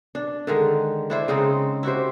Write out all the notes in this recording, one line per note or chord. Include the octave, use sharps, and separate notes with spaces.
D4
D3 D#3 G#3
D4 E4 C5
C#3 G#3 C4 D#4
E4 F#4 G4 C5